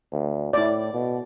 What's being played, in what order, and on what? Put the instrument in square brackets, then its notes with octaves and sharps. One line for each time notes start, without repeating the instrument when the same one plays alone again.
[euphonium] D2
[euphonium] A2 [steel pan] E4 D5
[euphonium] B2